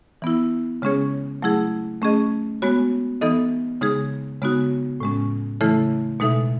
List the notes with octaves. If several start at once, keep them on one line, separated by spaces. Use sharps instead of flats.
E3 B3 E4
C#3 G#3 C#4 G#4 C#5
F#3 A3 E4 G#4
A3 C#4 G#4 D#5
G#3 B3 F#4 C#5
E3 B3 D#4 A4 D#5
C#3 G#3 D#4 G#4
C#3 G#3 B3 D#4 F#4
A2 G#3 C#4
C#3 E3 A3 E4 A4
B2 G#3 D#4 A4 E5